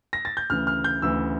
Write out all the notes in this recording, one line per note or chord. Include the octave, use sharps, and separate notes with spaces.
A#6
A6
G6
D2 C#3 E3 F6
F6
G6
D2 C#3 E3 E6